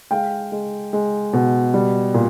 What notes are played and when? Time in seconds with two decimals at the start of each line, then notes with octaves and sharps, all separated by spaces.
0.11 G#3 F5 G5
0.52 G#3
0.93 G#3
1.33 B2
1.74 G3
2.14 A#2